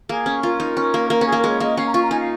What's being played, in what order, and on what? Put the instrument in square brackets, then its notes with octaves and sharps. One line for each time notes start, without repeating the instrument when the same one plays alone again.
[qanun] A#3 [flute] G#4
[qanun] C#4
[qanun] F4 [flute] A#4
[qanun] D#4
C#4
A#3
[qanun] A#3 [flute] A#4
[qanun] C#4
[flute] G#4
[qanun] A#3
[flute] A#4
[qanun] G#3
[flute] C#5
[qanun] A#3 [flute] D#5
[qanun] C#4 [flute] F5
[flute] A#5
[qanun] F4 [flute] C#6
[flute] A#5
[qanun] D#4 [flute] G#5
[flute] F5